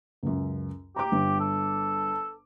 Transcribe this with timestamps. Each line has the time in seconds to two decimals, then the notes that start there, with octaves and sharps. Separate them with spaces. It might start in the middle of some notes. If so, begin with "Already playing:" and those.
0.23 C#2 F#2
0.96 G4 A#5 D6
1.12 G1
1.40 A4